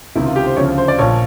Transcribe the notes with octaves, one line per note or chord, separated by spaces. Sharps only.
C#2 C3 D#3 E4
F4
G4
C5
D2 C#3 F3 C#5
C5
D5
A#1 A#2 F3 C#5